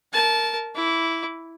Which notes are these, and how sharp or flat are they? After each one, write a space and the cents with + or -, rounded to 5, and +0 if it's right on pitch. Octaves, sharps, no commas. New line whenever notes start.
A#4 -10 A5 -20
E4 +0 D6 -30